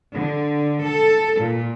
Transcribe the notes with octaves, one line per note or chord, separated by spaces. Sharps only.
D3
A4
A#2